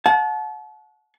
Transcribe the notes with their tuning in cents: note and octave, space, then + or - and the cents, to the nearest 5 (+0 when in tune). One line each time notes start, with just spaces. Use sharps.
F#5 -35 A5 -35